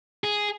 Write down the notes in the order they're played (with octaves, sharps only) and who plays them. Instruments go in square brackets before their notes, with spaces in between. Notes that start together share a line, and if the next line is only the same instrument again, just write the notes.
[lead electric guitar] G#4